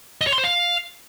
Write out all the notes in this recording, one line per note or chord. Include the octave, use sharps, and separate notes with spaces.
D#5
C#5
C6
C5
F5